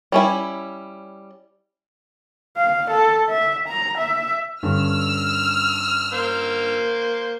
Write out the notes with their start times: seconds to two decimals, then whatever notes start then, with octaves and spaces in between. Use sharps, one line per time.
0.12 G3 C#4 E4
2.57 F5
2.91 A4
3.29 E5
3.68 A#5
3.98 E5
4.63 G2 D3 C#4 E6 F6
6.13 A#3 C5